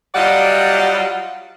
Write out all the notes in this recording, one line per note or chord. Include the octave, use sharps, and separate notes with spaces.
F#3 G3 F4 D5 D#5 F#5